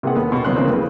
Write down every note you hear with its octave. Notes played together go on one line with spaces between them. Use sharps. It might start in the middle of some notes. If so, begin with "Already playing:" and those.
C3 A#3 G#4 B4 F#5
D#2 B3 A4
B2
D#2 E3 F#3 B3 C6 F#6
C#3 E3 F3 A#3 C4
F2 G#3 B4